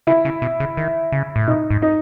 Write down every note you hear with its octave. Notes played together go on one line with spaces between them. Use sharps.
C#3 E4
C#3
B2
C#3
D#3
C#3
A2
B2 D#4
G#2
D#4